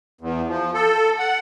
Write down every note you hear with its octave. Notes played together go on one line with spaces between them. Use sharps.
E2
F3
A4
F#5